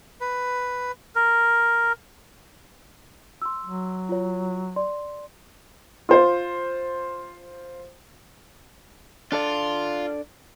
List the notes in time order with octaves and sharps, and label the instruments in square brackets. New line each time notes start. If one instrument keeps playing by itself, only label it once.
[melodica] B4
A#4
[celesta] C6 E6
[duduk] F#3
[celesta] F4 C#5
D5 C6
[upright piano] F4 C5
[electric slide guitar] D4 A4 D5 [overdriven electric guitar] F4